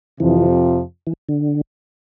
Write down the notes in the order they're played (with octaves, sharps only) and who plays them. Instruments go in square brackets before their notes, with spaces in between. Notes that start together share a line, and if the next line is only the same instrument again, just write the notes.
[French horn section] F2 C3 F3 [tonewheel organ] E3
[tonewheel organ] E3
D3